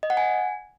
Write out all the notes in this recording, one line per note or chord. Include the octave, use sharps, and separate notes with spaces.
D#5
F#5
G#5